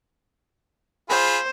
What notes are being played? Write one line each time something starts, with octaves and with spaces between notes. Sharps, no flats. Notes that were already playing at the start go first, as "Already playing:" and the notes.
F4 G#4 C5 B5